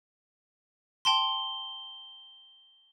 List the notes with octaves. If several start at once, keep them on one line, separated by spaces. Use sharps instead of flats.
G5 A5 C6 G7